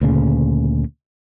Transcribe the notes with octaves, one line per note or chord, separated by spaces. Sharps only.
D2 A#2 C#3